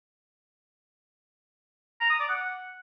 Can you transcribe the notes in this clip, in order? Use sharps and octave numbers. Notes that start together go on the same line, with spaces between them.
A#5
D#6
D5
F#5